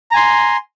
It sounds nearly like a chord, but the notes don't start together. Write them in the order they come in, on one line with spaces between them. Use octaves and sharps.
A#5 G#5 C6